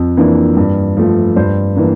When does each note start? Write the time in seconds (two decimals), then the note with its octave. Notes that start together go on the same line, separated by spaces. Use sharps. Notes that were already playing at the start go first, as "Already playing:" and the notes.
Already playing: F2
0.17 E3 A#3 D4
0.57 G2
0.97 F3 A3
1.36 G2 C5
1.76 E3 A#3 D4